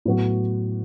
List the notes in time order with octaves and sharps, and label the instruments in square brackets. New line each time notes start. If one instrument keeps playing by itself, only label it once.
[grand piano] A2 F#3 B3 F#4